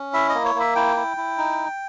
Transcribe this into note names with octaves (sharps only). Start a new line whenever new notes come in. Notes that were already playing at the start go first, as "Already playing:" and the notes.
Already playing: C#4
E4 E5
D#5
A#3
C#5
A#3
E5
E4 G5
E4
E4
D#4